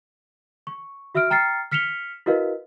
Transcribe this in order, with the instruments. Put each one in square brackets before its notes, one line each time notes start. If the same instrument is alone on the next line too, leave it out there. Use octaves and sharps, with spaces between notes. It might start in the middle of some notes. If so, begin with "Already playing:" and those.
[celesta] C#6
F#4 E5 E6 F6 D7
G5 A#5 F6 A6 C7 C#7
F6 B6 C#7 E7 F7 G7
E4 F#4 A#4 B4 D#5 F5